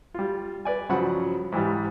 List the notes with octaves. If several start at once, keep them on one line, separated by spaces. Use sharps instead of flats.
G3 F4
B4 D5 G#5
G2 C#3 F3 F#3 F#5 B5
G#2 E3 G3